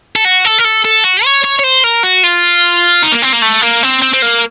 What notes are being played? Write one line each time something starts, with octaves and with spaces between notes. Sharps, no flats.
A4
F#4
A4
A#4
A4
A4
F#4
C#5
C#5
C#5
C5
A#4
F#4
F4
D#4
A#3
C4
A#3
A3
A#3
C4
C4
C4
A#3